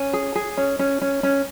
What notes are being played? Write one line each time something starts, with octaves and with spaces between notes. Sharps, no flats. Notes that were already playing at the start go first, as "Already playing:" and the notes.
Already playing: C#4 G#5
G#4
G#4
C#4
C#4
C#4
C#4